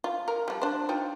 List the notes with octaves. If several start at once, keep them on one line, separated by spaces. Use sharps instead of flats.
F4
A#4
F3 G3
D4 C5
D#4 F4 G5